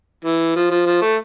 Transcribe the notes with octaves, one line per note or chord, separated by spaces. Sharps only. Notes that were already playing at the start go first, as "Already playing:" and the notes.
E3
F3
F3
F3
A3